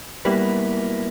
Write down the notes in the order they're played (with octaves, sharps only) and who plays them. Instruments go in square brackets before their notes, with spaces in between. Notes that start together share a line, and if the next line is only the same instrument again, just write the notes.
[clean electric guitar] B1 B2 A#3 E4 B4 [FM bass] G3